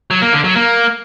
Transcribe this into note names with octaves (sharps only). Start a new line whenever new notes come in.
F#3
A#3
D3
F#3
A#3